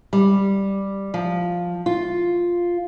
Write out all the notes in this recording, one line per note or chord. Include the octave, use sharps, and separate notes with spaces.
G3
F3
F4